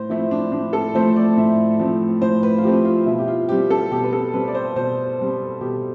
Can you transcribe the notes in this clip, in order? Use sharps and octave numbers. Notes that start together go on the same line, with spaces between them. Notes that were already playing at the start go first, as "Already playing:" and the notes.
Already playing: A2 C5
F3 A3 C4 E4
D4
A2 D4
A4
F3 A3 C4 C5
D5
A2 E5
F3 A3 C4
A2 C5
B4
F4
F3 A3 C4 G4
F4
B2 E4
G4
F4
G3 C4 G4
A4
B2 G4
B4
A4
G3 C4 B4
D5
C5
B2 C5
G3 C4
B2 G4